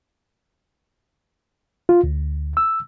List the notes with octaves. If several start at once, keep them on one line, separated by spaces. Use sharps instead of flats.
F4
D2
E6